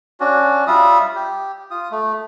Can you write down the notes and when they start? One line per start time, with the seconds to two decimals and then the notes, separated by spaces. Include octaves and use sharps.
0.20 C#4 D4 F#4
0.67 G3 F4 E5 D#6
1.15 G4
1.71 F4 D#6
1.91 A3